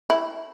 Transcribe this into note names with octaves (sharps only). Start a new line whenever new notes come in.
E4